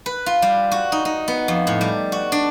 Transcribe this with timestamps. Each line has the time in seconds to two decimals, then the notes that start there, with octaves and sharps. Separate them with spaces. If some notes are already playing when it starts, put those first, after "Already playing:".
0.06 B4
0.26 F4
0.42 G3
0.71 F#4
0.92 D#4
1.05 D#4
1.28 B3
1.48 F2
1.67 A2
1.81 G3
2.12 F#4
2.32 D4